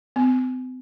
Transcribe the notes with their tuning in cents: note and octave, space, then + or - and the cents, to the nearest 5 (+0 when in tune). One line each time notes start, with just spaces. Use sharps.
C4 -45